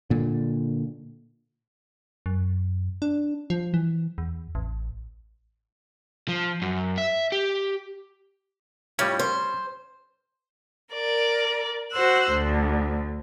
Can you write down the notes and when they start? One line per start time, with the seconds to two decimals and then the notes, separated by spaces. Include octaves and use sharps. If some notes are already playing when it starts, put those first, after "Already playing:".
0.10 A#2 D3
2.26 F#2
3.02 D4
3.50 F3
3.74 E3
4.18 E2
4.55 A1
6.28 F3
6.62 F#2
6.98 E5
7.32 G4
8.99 F2 A2 G3 C#4
9.19 C5
10.92 A#4 D5
11.92 F#4 C5 E6 F#6
12.31 D2